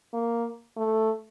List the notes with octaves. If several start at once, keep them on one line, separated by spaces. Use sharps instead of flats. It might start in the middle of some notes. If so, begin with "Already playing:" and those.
A#3
A3